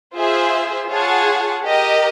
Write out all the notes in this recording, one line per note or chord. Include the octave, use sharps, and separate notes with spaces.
F4 G#4 C5 E5
F4 G#4 C#5 F#5 A5
G4 A#4 D#5